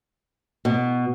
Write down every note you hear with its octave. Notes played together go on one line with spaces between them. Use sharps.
B2